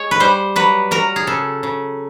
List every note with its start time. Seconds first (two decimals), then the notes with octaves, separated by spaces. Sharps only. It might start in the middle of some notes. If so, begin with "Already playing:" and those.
Already playing: G#3 C#5
0.11 B4
0.20 G3 C5
0.56 F#3 B4
0.91 F#3 A#4
1.16 G#4
1.27 C#3 A4
1.63 C#3